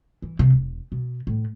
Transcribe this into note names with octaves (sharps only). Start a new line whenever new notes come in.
E3
C3
E1
B2
A2